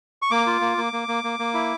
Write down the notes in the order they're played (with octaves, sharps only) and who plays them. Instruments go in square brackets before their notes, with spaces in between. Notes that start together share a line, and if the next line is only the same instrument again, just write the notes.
[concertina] C#6
A#3 D6
F4
A#3
A#3
A#3
A#3
A#3
A#3
E4